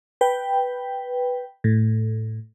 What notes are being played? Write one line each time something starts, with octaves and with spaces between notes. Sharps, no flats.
B4 G5
A2